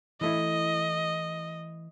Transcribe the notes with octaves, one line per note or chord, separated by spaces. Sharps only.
E3 A3 E4 D#5